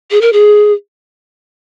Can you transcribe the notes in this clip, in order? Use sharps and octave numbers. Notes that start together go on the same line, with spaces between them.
G#4
A#4
G#4